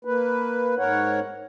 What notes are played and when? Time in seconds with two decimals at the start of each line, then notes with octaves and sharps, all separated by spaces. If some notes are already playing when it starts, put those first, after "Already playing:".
0.05 A#3 B4
0.78 G#2 A#4 C#5 F#5